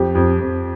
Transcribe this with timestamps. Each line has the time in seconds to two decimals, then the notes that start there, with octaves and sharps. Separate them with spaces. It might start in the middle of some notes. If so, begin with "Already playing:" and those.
Already playing: F2 G4
0.15 F2
0.39 F2